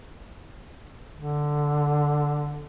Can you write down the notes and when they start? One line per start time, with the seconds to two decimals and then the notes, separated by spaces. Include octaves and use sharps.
1.16 D3